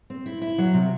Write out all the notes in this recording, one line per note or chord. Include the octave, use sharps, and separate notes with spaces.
C4
E4
E4
F#3
C3